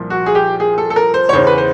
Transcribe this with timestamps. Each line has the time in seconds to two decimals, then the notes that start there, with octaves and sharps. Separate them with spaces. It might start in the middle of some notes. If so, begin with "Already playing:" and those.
Already playing: C2 A#2 F3
0.10 F#4
0.26 G#4
0.35 G4
0.60 G#4
0.78 A4
0.90 A4
0.96 A#4
1.14 C5
1.29 C#5
1.33 E2 C#3 E3 C5
1.47 B4
1.58 C5